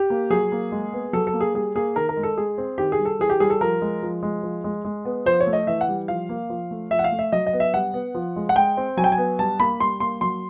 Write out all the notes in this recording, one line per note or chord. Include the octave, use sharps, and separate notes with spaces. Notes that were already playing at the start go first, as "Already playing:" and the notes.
Already playing: G4
A#3
F#3 G#4
A#3
G#3
B3
F#3 A4
A4
A#3
G#4
G3 G#4
A#3 G#4
D#3 A#4
A#4
G#3
A4
G#3 G#4
C4
D#3 G4
G#4
G3
A4
E3 G#4
G4
G3 G#4
A4
F3 A#4
G#3
F3
G#3
F3
G#3
G#3
B3
F3 C5
C#5
A3
D#5
E3 E5
F#5
G3
F3 F5
A#3
F3
A3
F3 E5
F#5
F5
A3
E5
F#3 D#5
D#5
B3
E5
G3 F#5
B3
F3
G#3
F#5
G#3 G5
C4
F#3 G#5
G5
G#5
B3
G3 A5
A#3 B5
G3 C6
A#3 C6
F#3 C6